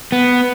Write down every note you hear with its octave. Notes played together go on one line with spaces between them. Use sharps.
B3